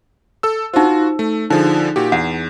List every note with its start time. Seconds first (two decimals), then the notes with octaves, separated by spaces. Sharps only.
0.43 A4 E6
0.74 D#4 F4 F#4 C5
1.19 A3
1.50 D3 F3 D#4 G#4
1.96 A#2 F#4 G4
2.12 E2 F#5